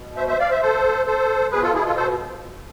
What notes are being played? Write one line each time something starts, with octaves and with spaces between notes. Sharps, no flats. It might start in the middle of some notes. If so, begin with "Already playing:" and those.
Already playing: B2
C5 E5
C5 E5
D5 F5
C5 E5
A4 C5
A4 C5
B2 G#4 B4
F4 A4
E4 G#4
F4 A4
A4 C5